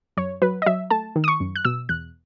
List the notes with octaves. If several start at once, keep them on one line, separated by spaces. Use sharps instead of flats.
F#2 C#5
F#3 B4
D#5
F#3 E5
A3 A5
D#3
D#6
C#6
F#2
F#6
B2 E6
E2 F#6